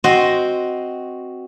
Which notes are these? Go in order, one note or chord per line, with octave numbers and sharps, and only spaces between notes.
C4 F#4 C5 D#5